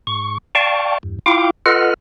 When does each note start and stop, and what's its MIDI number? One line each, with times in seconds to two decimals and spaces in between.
0.07 0.38 44
0.07 0.38 85
0.55 0.98 74
0.55 0.98 77
0.55 0.98 79
0.55 0.98 81
0.55 0.98 85
1.03 1.19 40
1.03 1.19 43
1.26 1.50 64
1.26 1.50 65
1.26 1.50 77
1.26 1.50 79
1.26 1.50 86
1.66 1.94 65
1.66 1.94 69
1.66 1.94 71
1.66 1.94 75
1.66 1.94 78
1.66 1.94 89